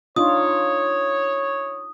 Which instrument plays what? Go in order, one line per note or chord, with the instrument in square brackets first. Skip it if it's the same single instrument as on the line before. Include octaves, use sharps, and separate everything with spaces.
[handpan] D4 D#4 F4 [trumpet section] C#5 [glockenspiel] D#6